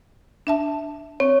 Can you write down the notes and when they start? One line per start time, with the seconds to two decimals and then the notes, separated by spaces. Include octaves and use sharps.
0.47 D4 E5 A5
1.20 C4 C#5